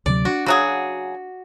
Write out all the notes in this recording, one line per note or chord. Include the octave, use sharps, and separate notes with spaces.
D2 C3 F#3 D5
D4 F#4
C#3 F#3 F#4 G#4